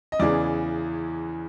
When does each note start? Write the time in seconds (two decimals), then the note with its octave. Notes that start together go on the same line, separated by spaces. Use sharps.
0.12 D#5
0.20 E2 C#3 E3 D5